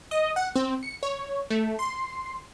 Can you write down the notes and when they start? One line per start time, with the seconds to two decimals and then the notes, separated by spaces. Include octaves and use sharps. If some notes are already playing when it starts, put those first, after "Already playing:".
0.11 D#5
0.36 F#5
0.56 C4
0.83 C#7
1.03 C#5
1.50 A3
1.79 C6